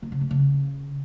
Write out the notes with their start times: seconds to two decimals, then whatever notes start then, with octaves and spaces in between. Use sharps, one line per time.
0.02 D#3
0.12 C#3
0.21 A3
0.31 C#3